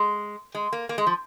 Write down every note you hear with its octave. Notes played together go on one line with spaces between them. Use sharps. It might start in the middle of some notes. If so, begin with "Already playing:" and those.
Already playing: G#3
G#3
A#3
A#3
G#3
F3